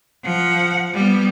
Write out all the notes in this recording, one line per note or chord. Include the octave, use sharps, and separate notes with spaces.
F3 F#5
G3 B3